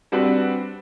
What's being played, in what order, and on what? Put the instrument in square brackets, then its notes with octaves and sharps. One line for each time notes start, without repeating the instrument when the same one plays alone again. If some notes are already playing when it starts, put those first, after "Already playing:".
[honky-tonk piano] G3 C4 D4 F#4 B4